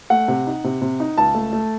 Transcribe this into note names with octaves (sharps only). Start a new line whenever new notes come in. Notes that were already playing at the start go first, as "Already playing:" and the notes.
A3 F#5
C3
D#4
C3
C3
D#4
C#2 A5
A3
A3